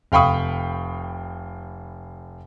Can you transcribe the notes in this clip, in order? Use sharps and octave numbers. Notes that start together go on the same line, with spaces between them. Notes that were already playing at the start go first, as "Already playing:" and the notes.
F1 F5 G5 B5 C#6 D#6